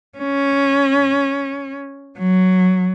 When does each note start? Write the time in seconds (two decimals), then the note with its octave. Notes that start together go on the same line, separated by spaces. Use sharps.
0.18 C#4
2.18 F#3